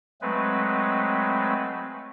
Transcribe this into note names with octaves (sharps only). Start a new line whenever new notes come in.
F#3 G#3 A3 C4 B4